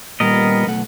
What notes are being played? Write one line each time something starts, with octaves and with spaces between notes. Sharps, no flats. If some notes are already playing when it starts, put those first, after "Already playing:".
A#2 G3 B3 A#4 D#5
B1 A3 F#5